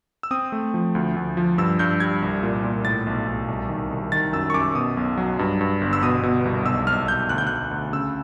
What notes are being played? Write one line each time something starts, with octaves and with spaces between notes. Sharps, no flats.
E6
C4 D#6
A3
F3
D2
D2
F3
G2 E6
G2 G6
G3 G#6
C2
A#2
A#2
A2 A6
B1
B1
C2
D#3
C2
D#3 A6
F#2 E6
C#6
F#2 D6
B2 D#6
B1
F#3
G2
G2
G1
E6
B2 D#6
B2
C2
B1 E6
B1 F6
B1 G6
D2 F#6
G6
D2 F#6
D2
C#3 E6